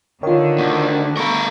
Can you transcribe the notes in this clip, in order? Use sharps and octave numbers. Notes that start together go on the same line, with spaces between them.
D3 D#3 F4 C#5
D2
A3 A#4 B5 C#6